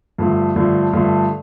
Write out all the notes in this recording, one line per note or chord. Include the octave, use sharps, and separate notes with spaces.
G2 D3 F3 A3
G2 D3 F3 A3
G2 D3 F3 A3